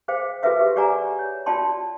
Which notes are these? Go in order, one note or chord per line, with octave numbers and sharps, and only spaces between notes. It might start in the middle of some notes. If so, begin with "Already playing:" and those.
G#4 C5 F5 G5
F#4 G#4 A4 B4 E5 F5
G4
G4 G#4 D5 F#5 G#5 A#5
C#5
F4 F#4 D5 G5 A5 C6